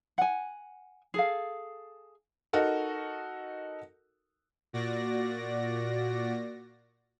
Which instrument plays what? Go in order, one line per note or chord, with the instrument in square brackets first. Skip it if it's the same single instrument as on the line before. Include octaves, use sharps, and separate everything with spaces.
[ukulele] F#5 G#5
G#4 A4 F5
[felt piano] D#4 F#4 A4 A#4
[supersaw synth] A#2 F#4 D5 A#6